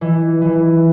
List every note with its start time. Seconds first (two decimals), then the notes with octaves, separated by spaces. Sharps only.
0.01 E3
0.41 E3